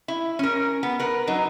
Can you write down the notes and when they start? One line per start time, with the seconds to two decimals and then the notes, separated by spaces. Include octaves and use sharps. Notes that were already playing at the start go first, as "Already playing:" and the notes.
0.08 E4
0.39 C#4 A#4
0.83 B3
1.00 A#4 B4
1.27 F#3 D#4